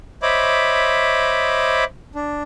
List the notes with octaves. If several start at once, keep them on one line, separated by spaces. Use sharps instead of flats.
C5 C#5 D#5 E5 B5 D6
D4